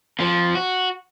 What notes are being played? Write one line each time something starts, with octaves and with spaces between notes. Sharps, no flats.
F2 F3
F#4